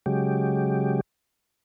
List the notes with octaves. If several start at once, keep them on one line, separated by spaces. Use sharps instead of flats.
C#3 F#3 G#3 G4